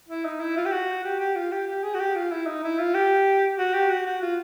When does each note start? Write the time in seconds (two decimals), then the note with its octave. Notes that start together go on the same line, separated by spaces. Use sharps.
0.09 E4
0.25 D#4
0.40 E4
0.57 F4
0.66 G4
0.72 F#4
1.04 G4
1.20 G4
1.36 F4
1.52 G4
1.67 G4
1.84 G#4
1.94 F#4
2.00 G4
2.15 F4
2.31 E4
2.47 D#4
2.63 E4
2.79 F4
2.94 G4
3.58 F#4
3.74 G4
3.90 F#4
4.06 F#4
4.22 F4